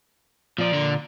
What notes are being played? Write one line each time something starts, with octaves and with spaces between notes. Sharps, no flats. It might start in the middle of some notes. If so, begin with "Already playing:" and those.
A#2 F3 D5
D3